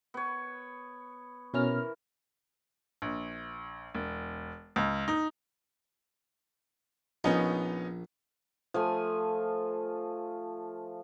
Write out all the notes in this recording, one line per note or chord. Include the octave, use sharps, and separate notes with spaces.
B3 C#5
B2 E3 C#4 A#4 F6
A#1
E1
C#2
D#4
A#1 B3 C#4 D#4
F3 A3 G#5